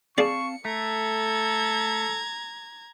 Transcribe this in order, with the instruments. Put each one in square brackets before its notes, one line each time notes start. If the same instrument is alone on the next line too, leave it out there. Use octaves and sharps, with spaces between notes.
[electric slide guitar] C4 F5 A5 [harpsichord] G#4 D5 [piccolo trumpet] C#6 [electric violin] C#7
[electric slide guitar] A3 [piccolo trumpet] A4 [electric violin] A#5 G#6